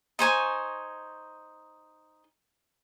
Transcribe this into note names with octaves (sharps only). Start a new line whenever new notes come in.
D#4 C5 G#5 C#6